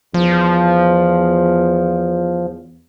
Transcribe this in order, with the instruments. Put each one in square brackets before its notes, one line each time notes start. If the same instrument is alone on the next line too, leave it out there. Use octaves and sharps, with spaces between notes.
[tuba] E2 [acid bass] F3